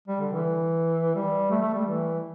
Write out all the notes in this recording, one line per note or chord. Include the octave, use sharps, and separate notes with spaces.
G3
D3
E3
G3
A3
A3
G3
E3